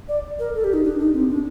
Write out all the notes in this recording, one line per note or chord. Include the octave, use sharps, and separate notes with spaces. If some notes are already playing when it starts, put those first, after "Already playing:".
D5
A#4
A4
G4
D#4
D4
D#4
C4
D4